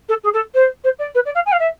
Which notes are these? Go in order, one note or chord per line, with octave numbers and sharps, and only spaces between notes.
A4
G#4
A4
C5
C5
D5
B4
D5
F5
G#5
F5
E5